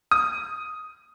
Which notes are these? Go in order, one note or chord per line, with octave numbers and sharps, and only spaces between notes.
D#6